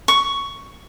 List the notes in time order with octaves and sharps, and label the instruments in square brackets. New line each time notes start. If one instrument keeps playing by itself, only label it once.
[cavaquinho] C#6